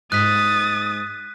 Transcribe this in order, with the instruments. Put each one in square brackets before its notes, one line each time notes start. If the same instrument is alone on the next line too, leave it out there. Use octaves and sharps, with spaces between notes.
[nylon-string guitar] G#2 [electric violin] D#6 A6 [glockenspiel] F#6 B6